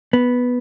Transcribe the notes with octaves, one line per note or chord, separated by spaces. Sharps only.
B3